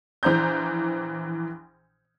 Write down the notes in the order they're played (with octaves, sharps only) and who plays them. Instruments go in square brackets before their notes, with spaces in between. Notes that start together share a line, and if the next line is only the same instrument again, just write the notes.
[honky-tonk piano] A#1 E3 C5 A#5 G6